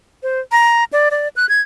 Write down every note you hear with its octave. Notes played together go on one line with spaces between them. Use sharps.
C5
A#5
D5
D5
F#6
G#6